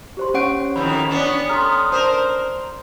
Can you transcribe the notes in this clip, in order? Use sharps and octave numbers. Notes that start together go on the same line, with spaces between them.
G4 C5 C6
C#4 C#5 F#5 C#6 D7
F2 D#3 E3 B5
B3 C#4 D4
A4 G5 A#5 C6 D#6 F6
C#4 A#4 C5 A5